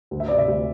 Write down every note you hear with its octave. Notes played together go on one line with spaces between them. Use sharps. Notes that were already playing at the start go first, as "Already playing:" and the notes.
D2
E5
C3 D5
E5
D2